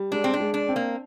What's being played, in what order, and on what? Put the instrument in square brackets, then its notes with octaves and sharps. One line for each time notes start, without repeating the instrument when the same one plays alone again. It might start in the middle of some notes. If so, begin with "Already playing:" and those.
Already playing: [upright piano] G3
[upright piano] G#3 [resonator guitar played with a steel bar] D4
[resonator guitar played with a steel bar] C4
D4
[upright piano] G#3
[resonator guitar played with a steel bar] D4
[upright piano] C4
[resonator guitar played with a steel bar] A#3